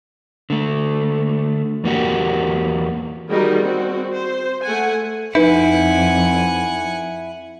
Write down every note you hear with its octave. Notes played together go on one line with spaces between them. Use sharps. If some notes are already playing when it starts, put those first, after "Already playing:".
D3 A3
E2 A#3 F#4 G4
D#3 G3 D#4 F#4 G#4 A#4
C4 F#4
C5
A3 F#5 G#5
F2 D#4 E4 B4 F#5 G#5